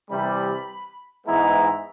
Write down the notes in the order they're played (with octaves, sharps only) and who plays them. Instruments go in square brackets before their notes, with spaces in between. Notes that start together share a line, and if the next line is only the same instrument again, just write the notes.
[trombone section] C3 E3 G3 [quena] B5
[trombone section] G#2 E3 G#3 B3 E4 [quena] A#5